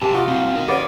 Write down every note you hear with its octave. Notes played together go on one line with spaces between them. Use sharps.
C3 A#3 G5 A5 A#5
A#3 F4 F#4 D#5 F5
B2 C4 E4
D#4 A#4
A#3 B3 C#4 D5